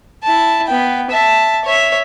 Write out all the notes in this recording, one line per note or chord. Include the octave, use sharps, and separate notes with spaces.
E4 A5
B3 G5
E5 A5
C#5 E5